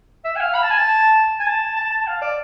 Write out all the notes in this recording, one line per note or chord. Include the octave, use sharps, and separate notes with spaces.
E5
G#5
F5
B5
A5
G#5
A5
G#5
A5
A5
A5
F5
D5